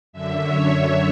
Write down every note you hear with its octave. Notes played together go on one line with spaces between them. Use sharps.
F#2 D3 E5
C#5